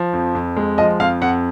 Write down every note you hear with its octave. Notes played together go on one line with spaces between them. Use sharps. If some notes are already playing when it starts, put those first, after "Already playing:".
Already playing: F3
F2
F2
G#3
F3 D#5
F2 F5
F2 F#5